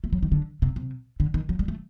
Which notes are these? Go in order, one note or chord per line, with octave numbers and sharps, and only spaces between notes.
A3
F#3
D#3
D3
C3
C3
D3
D#3
F#3
G3
A3